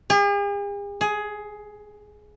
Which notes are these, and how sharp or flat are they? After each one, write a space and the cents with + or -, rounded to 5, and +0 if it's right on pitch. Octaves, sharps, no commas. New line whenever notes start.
G#4 -45
G#4 +15